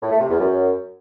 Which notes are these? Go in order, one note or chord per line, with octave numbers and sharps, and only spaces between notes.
A2
A3
C3
E2
F#2